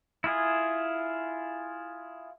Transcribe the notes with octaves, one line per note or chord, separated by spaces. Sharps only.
E4 F4 G#4